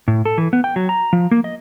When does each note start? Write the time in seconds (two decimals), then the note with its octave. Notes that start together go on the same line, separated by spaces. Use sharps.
0.08 A2
0.25 A4
0.38 E3
0.53 B3
0.64 G5
0.76 F#3
0.89 A#5
1.13 F3
1.31 A#3
1.44 D#5